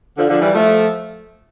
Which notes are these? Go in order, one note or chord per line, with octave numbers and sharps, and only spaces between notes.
D3 F3
D3 F3
E3 G3
F3 A3